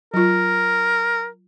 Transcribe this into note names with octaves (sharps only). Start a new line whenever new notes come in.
F#3 F4 A#4